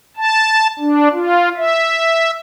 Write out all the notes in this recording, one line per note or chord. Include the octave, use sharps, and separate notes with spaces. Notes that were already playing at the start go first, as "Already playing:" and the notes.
A5
D4
F4
E5